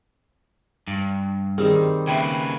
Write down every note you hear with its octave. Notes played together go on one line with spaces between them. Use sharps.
G2
D#3 G3 C4 G#4
C#3 A#3 B4 E5 G5